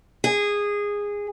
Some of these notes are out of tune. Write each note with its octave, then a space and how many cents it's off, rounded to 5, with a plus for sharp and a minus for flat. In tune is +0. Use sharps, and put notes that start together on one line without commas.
G#4 -15